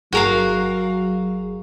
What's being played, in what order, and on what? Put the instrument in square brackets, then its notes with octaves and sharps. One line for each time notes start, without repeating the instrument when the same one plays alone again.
[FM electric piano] G1 G#4 [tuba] F#3 [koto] F#4 A#4 F5